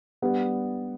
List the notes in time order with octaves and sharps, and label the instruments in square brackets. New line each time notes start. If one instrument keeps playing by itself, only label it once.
[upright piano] G3 B3 D4